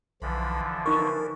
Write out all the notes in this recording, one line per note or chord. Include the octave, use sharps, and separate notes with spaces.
B1 D3 E3 F3
D#4 A#4 C#6